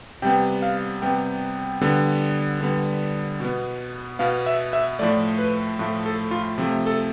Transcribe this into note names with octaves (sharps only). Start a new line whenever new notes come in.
C3 G3 B3 G5
F5
C3 G3 B3 G5
D3 G3 B3
D3 G3 B3
B2 B3
B2 B3 F5
E5
E5
A2 F3 A3 D5
B4
A2 F3 A3
A4
F4
C3 F3 A3
A4